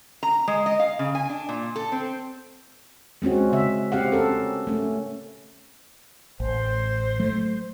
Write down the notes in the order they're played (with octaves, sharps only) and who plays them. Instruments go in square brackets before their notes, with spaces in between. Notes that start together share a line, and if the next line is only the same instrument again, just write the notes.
[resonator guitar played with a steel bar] A#5
G#3
D#5
F5
C#3
G#5
D4
A#2
A4
C4
[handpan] G#3 C4 C#4 F#4
C#3 E5
C4 G4 F5 F#5
C#4 A4 A#4
A3 C#4
[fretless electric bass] A1 [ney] C5
[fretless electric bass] F#3 A3